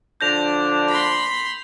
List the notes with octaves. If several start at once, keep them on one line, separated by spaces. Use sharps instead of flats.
D3 F3 D4 G6 A#6 F7
B5 C6